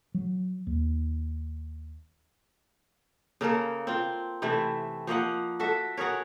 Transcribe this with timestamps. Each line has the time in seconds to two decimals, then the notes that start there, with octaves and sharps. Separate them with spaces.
0.14 F#3
0.67 D#2
3.41 C#3 A#3 A4 A#4
3.87 C4 F4
4.42 C3 E3 A3 E4
5.07 F3 A#3 D#5 F#5
5.60 F#4 A4 E5
5.97 F#4 G#4 A#4 C#5